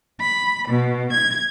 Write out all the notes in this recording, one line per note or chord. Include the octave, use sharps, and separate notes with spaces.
B5
B2
G#6